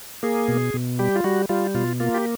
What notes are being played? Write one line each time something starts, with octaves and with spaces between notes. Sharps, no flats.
A#3 G#4
B2
B2
G3 G4
F4
G3 F#4
G3 F4
B2 F4
A#3 F4
G4